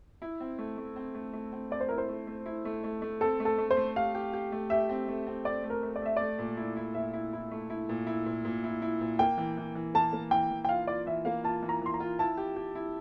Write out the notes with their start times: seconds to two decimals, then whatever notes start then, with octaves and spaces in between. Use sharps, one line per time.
0.22 E4
0.40 C4
0.58 A3
0.78 A3
0.96 C4
1.15 A3
1.33 A3
1.52 C4
1.71 C4 D5
1.80 C5
1.88 E4 A#4
1.98 C5
2.09 A3
2.27 A3
2.46 E4
2.65 A3
2.84 A3
3.02 A3
3.21 C4 A4
3.40 A3
3.45 A4
3.58 A3
3.71 C5
3.77 A3
3.96 G4 F5
4.15 G4
4.33 G4
4.52 A3
4.70 G4 E5
4.89 C4
5.08 A3
5.27 C4
5.45 C4 D5
5.64 A3
5.70 A#4
5.83 A3
5.96 D5
6.02 A3 E5
6.16 A3 D5
6.39 A#2
6.57 E4
6.76 E4
6.95 A#2 E5
7.13 E4
7.33 E4
7.51 A3
7.70 E4
7.89 A#2
8.07 E4
8.26 A#2
8.45 A#2
8.64 E4
8.82 E4
9.01 A#2
9.19 A#3 G5
9.38 E3
9.58 E3
9.75 E3
9.94 A#3 A5
10.13 A#3
10.31 E3 G5
10.51 E3
10.65 G5
10.69 F4 F5
10.87 F4 D5
11.06 E3 E5
11.25 A#3 F5
11.44 F4 A5
11.62 E3
11.69 A#5
11.81 E3 C6
11.94 A#5
12.00 F4
12.19 E4 A5
12.37 G4
12.56 G4
12.75 E4